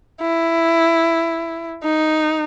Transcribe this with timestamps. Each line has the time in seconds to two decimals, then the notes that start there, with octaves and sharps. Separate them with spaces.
0.21 E4
1.84 D#4